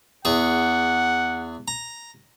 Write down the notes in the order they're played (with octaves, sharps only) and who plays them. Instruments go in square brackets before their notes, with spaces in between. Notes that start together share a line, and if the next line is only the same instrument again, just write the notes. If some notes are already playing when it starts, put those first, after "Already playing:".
[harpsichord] E2 G#4 [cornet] F#5
[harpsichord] A#5